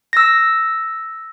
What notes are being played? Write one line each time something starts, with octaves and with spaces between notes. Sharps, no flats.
E6 A#6